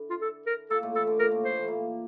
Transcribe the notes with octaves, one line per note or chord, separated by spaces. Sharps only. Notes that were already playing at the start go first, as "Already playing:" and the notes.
Already playing: D3 D4 E4
F4
A4
A#4
A#2 A#3 A4
A2 A3
E3 E4 A4
D3 D4
A#2 A#3 A#4
A2 A3
F3 C5
E3
A#2 A#3